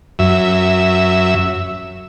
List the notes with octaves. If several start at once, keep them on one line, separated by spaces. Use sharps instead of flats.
F#2 E5